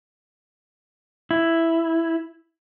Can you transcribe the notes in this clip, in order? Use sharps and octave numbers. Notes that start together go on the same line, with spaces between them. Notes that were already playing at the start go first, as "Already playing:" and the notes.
E4